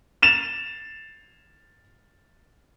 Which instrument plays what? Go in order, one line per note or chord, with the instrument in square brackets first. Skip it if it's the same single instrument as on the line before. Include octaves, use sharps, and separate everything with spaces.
[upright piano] A6 E7 F7